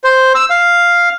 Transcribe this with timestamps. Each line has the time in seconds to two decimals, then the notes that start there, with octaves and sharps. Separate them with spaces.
0.04 C5
0.35 E6
0.50 F5